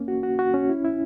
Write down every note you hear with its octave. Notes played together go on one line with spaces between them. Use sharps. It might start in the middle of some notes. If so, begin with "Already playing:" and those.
Already playing: A#3 C#4
F#4
F#4
F#4
C#4
E4
E4